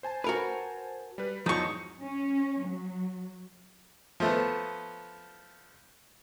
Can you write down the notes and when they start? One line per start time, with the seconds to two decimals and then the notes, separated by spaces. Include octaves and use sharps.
0.03 C5 G#5 A5
0.24 F#4 A#4 B4
1.18 G3 B4
1.46 E2 G#2 F3 F#3 D#4 C#6
2.03 C#4
2.64 F#3
4.20 F3 A3 B3